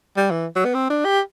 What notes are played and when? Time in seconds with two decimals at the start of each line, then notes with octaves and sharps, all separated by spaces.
0.17 G3
0.31 E3
0.56 F#3
0.65 B3
0.74 C4
0.90 D4
1.05 G4